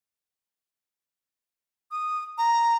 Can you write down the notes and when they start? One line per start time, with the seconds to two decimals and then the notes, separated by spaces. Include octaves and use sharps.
1.91 D#6
2.38 A#5